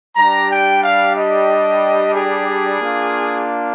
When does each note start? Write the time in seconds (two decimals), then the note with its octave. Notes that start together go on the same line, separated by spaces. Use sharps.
0.16 G3 D4 G4 A#5
0.49 G5
0.82 F5
1.15 D#5
2.14 G#4
2.80 A#3 D4 F4